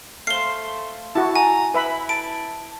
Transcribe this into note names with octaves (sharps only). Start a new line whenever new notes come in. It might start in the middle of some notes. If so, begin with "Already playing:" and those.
A3 C5 F5 C7 G7
E4 F#4 A5
G#5 A#5
E4 B4 E5 B5
A5 D7